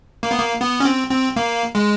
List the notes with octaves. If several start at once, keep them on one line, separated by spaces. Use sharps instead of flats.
A#3
B3
A#3
B3
C#4
C4
C4
A#3
G#3